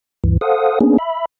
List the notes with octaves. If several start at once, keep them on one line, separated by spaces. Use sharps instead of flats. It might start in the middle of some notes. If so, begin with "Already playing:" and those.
D2 G2 E3
A4 C5 F5 F#5 D#6
A#3 B3 C#4 D4 G#4
E5 B5